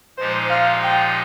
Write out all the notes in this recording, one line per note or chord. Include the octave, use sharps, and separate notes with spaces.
A#2 F3 G#3 D#4 G4 C5
F5
G5